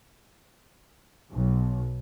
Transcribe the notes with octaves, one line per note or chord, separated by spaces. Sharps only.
B1